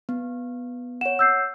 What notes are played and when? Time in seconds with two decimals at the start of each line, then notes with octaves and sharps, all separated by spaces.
0.09 B3
1.01 C#5 F#5 E7
1.19 E6 G6 C7